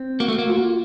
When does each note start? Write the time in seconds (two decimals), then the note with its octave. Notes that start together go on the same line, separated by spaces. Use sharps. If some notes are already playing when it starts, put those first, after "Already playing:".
Already playing: C4
0.20 A#3 F#4
0.28 A3
0.39 A#3
0.48 F4
0.57 F#4
0.64 F4